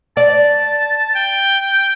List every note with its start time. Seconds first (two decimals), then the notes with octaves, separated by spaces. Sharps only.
0.17 D5 A5
1.15 G5